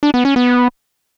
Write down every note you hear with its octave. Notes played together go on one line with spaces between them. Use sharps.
D4
B3
C#4
B3